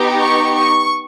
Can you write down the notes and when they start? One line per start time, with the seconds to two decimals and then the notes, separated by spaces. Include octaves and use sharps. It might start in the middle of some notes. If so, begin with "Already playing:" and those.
Already playing: B3 D#4 G4
0.20 C#6
0.56 C#6